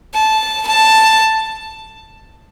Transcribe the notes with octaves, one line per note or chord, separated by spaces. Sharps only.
A5
A5